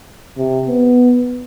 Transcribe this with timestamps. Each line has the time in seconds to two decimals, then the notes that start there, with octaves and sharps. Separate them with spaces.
0.37 C3
0.67 B3